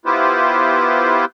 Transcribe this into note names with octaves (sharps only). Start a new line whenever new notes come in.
B3 E4 F4 G4 B4 C5